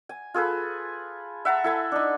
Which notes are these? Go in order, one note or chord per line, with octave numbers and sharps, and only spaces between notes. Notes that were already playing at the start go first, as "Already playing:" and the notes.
G#5
F4 G#4 A4 B4
E5 F#5 A5 A#5
E4 A4 G#5
D4 D#4